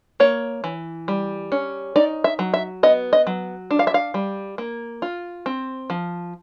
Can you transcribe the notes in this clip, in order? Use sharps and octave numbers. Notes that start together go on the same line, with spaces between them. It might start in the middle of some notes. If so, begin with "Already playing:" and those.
A#3 C#5
E3
G3
C#4
D#4 D5
E5
F#3
E5
B3 D#5
D#5
F#3
D4
F5
E5
F5
G3
A#3
F4
C4
F3